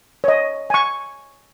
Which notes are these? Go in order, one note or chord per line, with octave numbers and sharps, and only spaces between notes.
C#5 D#5
G#5 C#6